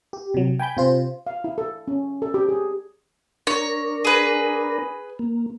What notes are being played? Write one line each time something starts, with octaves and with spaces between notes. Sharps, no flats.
G4
C3 F#3
G5 G#5 B5 G6
C3 F4 C5
F5
E4
A4
C#4
A4
G4
G#4
D4 A#4 C#5
G#4 B4
A#3